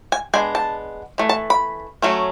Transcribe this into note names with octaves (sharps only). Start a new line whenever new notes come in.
G#5
G#3 B3 D4 G#5
A5
E3 A3
A5
B5
F#3 A3 C#4